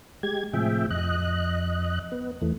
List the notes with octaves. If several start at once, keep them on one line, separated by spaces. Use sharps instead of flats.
G#3 G4 G#6
A2 C3 F3 G#4 E5 G5
F2 D#5 F#6
B3
E2 E3 A3